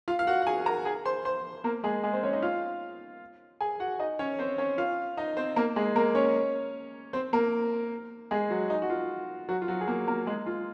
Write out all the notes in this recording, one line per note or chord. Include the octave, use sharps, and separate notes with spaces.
F4 F5
F5
F#4 F#5
F#5
G#4 G#5
A#4 A#5
G#4 G#5
C5 C6
C5 C6
A#3 A#4
G#3 G#4
G#3 G#4
C4 C5
C#4 C#5
D#4 D#5
F4 F5
G#4 G#5
F#4 F#5
D#4 D#5
C#4 C#5
C4 C5
C#4 C#5
F4 F5
D#4 D#5
C4 C5
A#3 A#4
G#3 G#4
A#3 A#4
C#4 C#5
C4 C5
A#3 A#4
G#3 G#4
F#3 F#4
D#4
F#4
F4
F#3 F#4
F4
F#3 F#4
G#4
A#3 A#4
A#3 A#4
G#3 G#4
F4